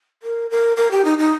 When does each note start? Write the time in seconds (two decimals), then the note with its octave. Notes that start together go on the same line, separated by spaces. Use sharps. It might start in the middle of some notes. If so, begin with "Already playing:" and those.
0.23 A#4
0.50 A#4
0.76 A#4
0.91 G4
1.04 D#4
1.18 D#4